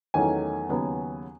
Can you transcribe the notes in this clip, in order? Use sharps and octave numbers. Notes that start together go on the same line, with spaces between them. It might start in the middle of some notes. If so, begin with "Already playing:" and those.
E2 D#3 F#3 A3 C#4 G#5
D#2 C#3 F#3 B3